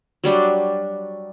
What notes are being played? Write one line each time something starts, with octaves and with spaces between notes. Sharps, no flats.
F#3 G3 D4